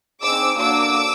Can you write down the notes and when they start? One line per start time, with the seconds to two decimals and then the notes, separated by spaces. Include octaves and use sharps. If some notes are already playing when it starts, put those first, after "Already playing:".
0.22 C4 D#4 G#4 D6 E6
0.58 A#3 D4 F#4 A4 D6 E6